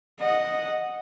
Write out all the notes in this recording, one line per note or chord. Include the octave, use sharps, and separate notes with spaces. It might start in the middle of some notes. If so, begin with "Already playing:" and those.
D#5 F#5